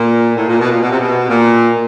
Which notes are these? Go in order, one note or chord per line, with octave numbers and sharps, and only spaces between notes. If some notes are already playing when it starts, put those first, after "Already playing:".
Already playing: A#2
A2
A#2
B2
A#2
B2
C3
B2
A#2